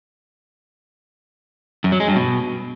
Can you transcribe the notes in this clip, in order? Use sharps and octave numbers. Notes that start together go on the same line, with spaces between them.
F#2
F#3
G#3
G2
B2